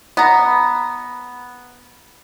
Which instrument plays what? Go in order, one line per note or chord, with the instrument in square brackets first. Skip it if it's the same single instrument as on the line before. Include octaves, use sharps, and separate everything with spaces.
[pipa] B3 A#5